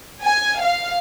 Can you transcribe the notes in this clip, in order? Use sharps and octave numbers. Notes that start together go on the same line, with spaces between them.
G#5
F5